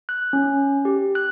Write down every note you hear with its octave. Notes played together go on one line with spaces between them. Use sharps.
F#6
C#4
G4
F#6